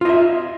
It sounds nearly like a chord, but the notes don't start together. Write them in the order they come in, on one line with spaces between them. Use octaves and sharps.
F4 D#5 E5